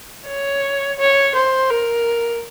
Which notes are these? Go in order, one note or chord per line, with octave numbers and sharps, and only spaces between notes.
C#5
C#5
C5
A#4